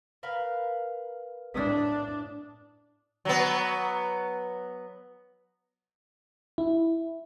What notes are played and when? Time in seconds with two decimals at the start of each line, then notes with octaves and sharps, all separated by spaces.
0.23 A#4 B4 F5
1.54 A2 D4 D#6 B6
3.25 F#3 B3
6.58 E4